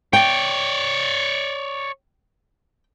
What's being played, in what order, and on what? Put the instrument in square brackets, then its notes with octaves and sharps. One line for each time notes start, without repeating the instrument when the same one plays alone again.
[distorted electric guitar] C#5 D5 [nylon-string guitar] G5